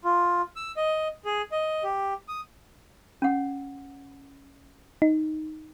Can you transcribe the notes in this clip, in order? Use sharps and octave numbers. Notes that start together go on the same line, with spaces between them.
F4
E6
D#5
G#4
D#5
G4
D#6
C#4 F#5
D#4